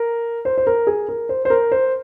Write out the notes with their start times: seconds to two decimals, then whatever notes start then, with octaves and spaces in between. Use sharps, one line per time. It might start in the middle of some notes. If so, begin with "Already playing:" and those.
Already playing: A#4
0.45 C5
0.58 C5
0.67 A#4
0.87 G#4
1.09 A#4
1.29 C5
1.45 C5
1.50 A#4
1.72 C5